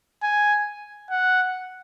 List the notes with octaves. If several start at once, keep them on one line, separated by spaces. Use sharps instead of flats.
G#5
F#5